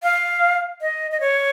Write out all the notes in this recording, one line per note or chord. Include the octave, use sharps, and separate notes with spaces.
F5
D#5
D#5
C#5